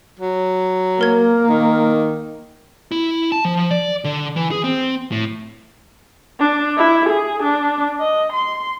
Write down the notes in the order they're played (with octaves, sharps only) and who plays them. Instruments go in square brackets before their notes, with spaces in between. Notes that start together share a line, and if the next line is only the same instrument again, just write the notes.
[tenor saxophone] F#3
[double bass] A#3 [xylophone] A#4 G#6
[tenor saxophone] D#3
[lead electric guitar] E4
A5
F3
D5
D3
E3
G#4
C4
A2
[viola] D4
E4
G#4
D4
D#5
C6